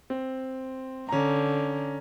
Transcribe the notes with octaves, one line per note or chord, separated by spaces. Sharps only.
C4
D3 C#4 A#5